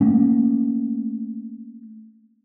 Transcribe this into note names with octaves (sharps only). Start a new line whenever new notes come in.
A3 A#3 C#4